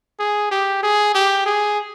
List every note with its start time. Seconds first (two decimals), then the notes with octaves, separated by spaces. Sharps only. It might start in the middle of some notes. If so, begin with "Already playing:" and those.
0.19 G#4
0.51 G4
0.83 G#4
1.14 G4
1.46 G#4